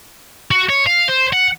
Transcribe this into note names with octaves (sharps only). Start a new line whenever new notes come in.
F#4
C#5
F5
C5
F#5